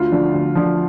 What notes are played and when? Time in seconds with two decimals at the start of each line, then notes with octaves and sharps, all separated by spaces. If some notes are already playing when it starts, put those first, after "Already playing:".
Already playing: D2 F4
0.12 D3 F3
0.34 D2
0.55 D3 F3